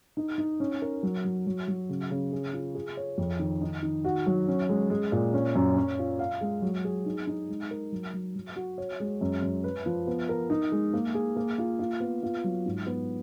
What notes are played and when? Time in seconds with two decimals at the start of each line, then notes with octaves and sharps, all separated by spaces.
0.17 D#4
0.38 D#4
0.60 C#4
0.82 A#4
1.03 F#3
1.24 F#3
1.46 F#3
1.68 F#3
1.89 C#3
2.10 C#3
2.32 G#4
2.53 F4
2.75 G#4
2.97 C#5
3.18 F2
3.39 D#3
3.61 D#4
3.83 D#3
4.05 F#4
4.26 F#3
4.48 C#4
4.69 G#3
4.90 G#3
5.12 A#2
5.33 C#4
5.55 F#2
5.76 C#4
5.99 F4
6.19 F5
6.41 G#3
6.62 F#3
6.84 G#4
7.06 D#4
7.27 D#4
7.48 G#3
7.71 A#4
7.92 F#3
8.13 F#3
8.35 F#3
8.56 F#4
8.78 C#5
9.00 G#3
9.21 F#2
9.42 F#2
9.64 B4
9.86 F3
10.07 B3
10.29 A#4
10.50 D#4
10.72 G#3
10.93 A#3
11.14 G#4
11.36 A#3
11.58 F4
11.79 F4
12.00 B3
12.23 F4
12.44 F#3
12.66 G#2
12.86 B3